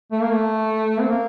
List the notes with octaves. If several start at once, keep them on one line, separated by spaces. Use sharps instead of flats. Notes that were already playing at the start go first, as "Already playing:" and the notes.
A3
A#3
A3
C4
A#3